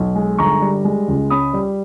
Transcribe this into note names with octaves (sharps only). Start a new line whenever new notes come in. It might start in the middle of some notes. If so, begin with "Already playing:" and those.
Already playing: B1
G#3
G1 A#5 C#6
G3
G#3
C#2
C#4 B5 D#6
G3